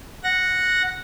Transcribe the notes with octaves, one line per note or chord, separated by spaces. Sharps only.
F#5 A#6